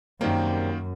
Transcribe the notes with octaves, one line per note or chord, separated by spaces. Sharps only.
F#2 C3 D#3 G3 A#3 C4